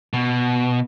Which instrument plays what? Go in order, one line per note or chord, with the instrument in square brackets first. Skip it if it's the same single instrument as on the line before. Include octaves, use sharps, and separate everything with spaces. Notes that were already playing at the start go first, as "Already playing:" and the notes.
[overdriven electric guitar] B2